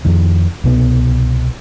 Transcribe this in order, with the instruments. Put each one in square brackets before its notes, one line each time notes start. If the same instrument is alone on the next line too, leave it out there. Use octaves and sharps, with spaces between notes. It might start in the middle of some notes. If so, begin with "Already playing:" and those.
[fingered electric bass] F2 D#3
C2 B2 B3